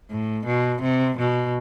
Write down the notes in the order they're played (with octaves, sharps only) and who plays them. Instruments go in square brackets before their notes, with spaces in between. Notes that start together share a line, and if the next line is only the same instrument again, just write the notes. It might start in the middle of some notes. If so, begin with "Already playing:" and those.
[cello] A2
B2
C3
B2